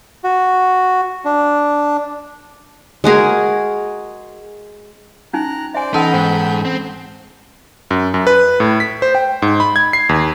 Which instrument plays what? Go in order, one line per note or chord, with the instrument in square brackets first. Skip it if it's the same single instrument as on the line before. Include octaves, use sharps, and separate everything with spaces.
[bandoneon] F#4
D4
[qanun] G#3 F#4 G#4 A#4
[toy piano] C#4 D#4 G#5 [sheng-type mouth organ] A#5 F#6
[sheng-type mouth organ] C5 D5 [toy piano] E5 G#5
[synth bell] E3 C#4 A5 [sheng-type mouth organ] B3 B5 G6 [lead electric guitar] D#4
[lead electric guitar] G#2 [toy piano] C5 G5
[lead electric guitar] C4
[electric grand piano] F#2
F#2
B4
A2
B6
C5
G5
G#2
B5
G#6
C7
D#2